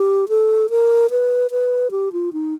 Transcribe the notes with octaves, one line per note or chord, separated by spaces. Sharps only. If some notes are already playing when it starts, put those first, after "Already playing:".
Already playing: G4
A4
A#4
B4
B4
G4
F4
D#4